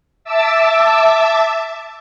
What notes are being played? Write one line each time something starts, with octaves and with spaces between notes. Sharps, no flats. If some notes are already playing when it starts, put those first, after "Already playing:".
E5 A5 D6 E6